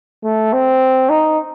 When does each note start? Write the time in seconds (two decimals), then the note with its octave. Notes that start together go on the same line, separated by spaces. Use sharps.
0.24 A3
0.53 C4
1.09 D#4